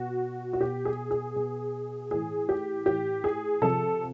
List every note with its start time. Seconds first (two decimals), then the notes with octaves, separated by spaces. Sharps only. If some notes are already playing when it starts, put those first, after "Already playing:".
Already playing: B2 F#4
0.53 F#4
0.61 B2 G4
0.85 G#4
1.11 G#4
1.36 B2
2.11 A2 E3 G#4
2.49 G4
2.86 A2 E3 G4
3.24 G#4
3.62 C3 F3 A4